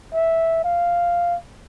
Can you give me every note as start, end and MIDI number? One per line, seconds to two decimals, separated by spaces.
0.14 0.63 76
0.64 1.36 77